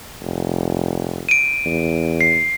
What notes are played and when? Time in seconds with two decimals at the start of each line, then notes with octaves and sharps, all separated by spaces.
0.20 F1
1.29 D7 D#7
1.65 E2
2.21 C7